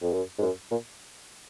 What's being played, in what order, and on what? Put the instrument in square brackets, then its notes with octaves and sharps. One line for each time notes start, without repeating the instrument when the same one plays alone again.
[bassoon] F2
F#2
G#2
F#2
A#2